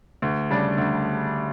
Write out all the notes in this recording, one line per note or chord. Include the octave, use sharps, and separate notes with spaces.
D2
C#3 G3 D4
D2